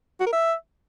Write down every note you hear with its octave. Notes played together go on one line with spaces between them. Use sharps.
F#4
A#4
E5